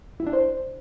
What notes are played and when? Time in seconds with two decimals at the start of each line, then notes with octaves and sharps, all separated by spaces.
0.20 E4
0.27 D4
0.33 C5